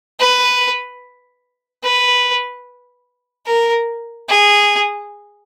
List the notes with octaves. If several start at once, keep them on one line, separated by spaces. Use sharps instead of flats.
B4
B4
A#4
G#4